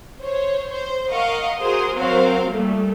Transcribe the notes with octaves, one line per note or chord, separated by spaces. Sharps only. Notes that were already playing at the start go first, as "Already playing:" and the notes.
C5 C#5
C5
A#4 D#5 F5 F#5 C#6
F#4 G#4 A#4 C5 C6 D#6
F#3 C4 F#4 A#4 C5 F5
A#2 G3 A3